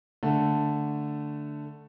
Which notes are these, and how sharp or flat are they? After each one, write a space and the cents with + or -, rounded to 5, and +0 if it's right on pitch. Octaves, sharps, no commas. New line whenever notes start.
D3 +0 A3 +0